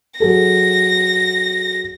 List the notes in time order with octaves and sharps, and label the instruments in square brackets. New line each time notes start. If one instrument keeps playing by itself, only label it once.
[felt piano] F#3 G#4 A4 [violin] A#6